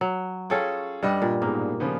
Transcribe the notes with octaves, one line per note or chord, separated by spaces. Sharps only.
F#3
C#4 F4 G#4 A4 C#5 G5
G2 G3 D4 G4 D#5 F#5
A#2
G#2 B2 G#3 A#3
C#3 F3 B3